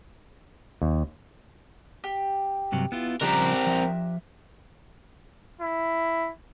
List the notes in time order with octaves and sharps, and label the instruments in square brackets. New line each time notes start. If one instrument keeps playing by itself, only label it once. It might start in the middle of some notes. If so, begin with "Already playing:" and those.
[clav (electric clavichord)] D#2
[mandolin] G4
[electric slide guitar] G2 C3 F#3
B3 E4 F4
[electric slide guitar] C#3 F3 G3 [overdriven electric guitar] C4 A#4 [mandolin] D4 G4 A#5
[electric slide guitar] F3 E5
[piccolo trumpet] E4